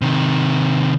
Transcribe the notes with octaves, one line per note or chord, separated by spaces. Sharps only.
C3 D#3